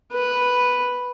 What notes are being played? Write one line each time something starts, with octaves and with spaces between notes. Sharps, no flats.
B4